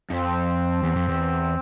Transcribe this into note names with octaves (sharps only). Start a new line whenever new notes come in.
F2 C4
E2
F2
E2